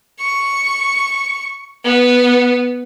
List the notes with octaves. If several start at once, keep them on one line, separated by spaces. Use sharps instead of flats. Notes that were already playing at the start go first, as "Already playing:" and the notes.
C#6
B3